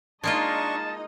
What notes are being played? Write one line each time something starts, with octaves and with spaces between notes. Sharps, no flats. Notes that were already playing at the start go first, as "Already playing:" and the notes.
G#3 A#3 D4 D#4 F4 D#5 A5 C#6